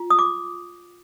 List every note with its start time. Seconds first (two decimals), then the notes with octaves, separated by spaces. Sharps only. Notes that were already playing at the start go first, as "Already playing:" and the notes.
Already playing: F4
0.10 D#6
0.19 D6